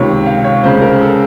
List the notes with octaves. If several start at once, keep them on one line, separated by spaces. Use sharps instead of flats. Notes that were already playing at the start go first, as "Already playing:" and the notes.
Already playing: C#2 C3 D#3 C#5
F5
C#5
C#2 C#3 C5
A#4
A4